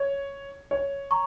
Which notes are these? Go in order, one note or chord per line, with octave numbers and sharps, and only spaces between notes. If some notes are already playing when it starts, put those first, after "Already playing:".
Already playing: C#5
C#5
A#5 C#6